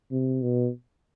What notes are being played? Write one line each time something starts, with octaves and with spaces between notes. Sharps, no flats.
C3
B2